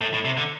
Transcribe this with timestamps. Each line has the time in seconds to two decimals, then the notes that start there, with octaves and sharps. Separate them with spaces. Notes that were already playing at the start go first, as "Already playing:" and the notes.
0.01 A2
0.13 A2
0.25 C3
0.37 D3